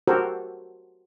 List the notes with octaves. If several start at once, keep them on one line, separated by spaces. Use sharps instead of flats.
F#4 G4 A4 A#4 C5